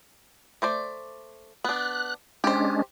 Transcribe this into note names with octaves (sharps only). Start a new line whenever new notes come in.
A3 C5 D5
B3 D4 F#6
G#3 C#4 D4 G4 C5